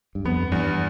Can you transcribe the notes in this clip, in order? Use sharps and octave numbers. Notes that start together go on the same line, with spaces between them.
G2
F2 B3
E2 G2